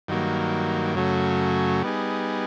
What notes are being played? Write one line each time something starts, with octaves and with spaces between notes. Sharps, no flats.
G2 D#3 F#3 A#3
F#2 C#3 F#3 A3
G3 B3 D#4 G#4